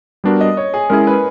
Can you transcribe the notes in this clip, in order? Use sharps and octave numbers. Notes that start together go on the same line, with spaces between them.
G3 B3 D4 F#4 A#4
D#5
C#5
G#4
G#3 C#4 E4 G#4 A#4
B4